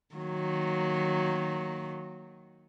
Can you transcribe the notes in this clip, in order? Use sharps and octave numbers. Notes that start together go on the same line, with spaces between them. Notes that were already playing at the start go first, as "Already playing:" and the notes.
D#3 F#3 A#3